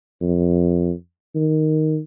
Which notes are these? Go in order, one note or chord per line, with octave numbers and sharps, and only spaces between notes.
F2
D#3